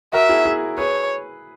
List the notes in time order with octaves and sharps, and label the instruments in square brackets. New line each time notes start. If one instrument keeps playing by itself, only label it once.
[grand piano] F#4 A#4 [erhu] E5
[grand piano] E4 G#4
E4 G#4
[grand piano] G#4 B4 [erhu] C#5